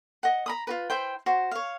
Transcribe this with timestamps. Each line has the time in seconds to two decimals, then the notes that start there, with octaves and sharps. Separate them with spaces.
0.23 D#5 F#5
0.46 A#5 B5 D#6
0.67 F4 F#4 B4
0.90 E4 C5 G5
1.26 F#4 C5
1.51 C#5 F5